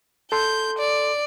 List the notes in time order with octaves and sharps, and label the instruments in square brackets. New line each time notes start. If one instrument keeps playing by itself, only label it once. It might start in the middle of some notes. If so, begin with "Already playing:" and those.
[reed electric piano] A4 C6 [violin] G6
[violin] D5